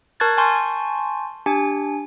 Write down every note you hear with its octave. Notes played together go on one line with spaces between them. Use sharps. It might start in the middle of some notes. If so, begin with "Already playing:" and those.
A#4 A5 C#6 F#6 G#6 A6
G#5 A5 C6 C#6 G6
D4 G4 G#5